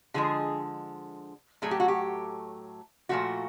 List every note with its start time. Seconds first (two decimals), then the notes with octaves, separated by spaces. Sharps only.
0.14 D3 F3 G#3 G#4
1.62 A2 F#3 A3 G#4
1.71 G4
1.80 F#4
1.88 G4
3.09 A#2 F3 A3 F#4